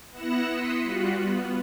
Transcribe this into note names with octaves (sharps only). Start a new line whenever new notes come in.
B3 E4 F#6 A#6 C#7 E7
C6 D#6 B6 C#7
G3 F4 F#4 F#6
B3